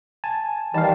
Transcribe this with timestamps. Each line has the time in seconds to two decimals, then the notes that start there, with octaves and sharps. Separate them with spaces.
0.24 G#5 A5
0.74 D#3 E3 G3 F5 A5